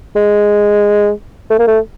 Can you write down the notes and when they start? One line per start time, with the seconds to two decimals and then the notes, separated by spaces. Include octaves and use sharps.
0.16 G#3
1.50 A3
1.59 A#3
1.68 A3